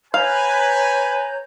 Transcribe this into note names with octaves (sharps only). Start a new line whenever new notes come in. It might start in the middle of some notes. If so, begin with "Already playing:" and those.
B4 C#5 F5 G#5 A#5 G6